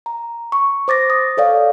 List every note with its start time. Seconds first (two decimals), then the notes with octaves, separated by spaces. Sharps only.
0.06 A#5
0.52 C#6
0.88 C5 D6 A6 A#6
1.10 D#6
1.37 A4 C#5 D5 F5